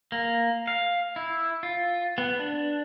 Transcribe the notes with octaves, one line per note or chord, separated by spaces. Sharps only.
A#3
F5
E4
F4
B3
D4